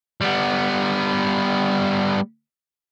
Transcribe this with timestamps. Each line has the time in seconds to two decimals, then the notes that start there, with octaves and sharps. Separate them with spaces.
0.21 G3 B3